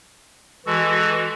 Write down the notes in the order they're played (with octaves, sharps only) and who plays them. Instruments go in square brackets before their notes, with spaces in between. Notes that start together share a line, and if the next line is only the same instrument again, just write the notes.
[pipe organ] E3 F#4 [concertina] G#3 A4